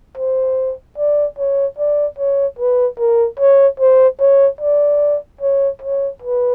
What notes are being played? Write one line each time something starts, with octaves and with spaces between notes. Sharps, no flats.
C5
D5
C#5
D5
C#5
B4
A#4
C#5
C5
C#5
D5
C#5
C#5
B4